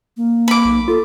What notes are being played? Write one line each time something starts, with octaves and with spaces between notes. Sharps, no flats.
A#3
B5 D6
B1
F4 A4